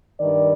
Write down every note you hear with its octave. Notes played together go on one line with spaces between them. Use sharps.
G2 D#3 D5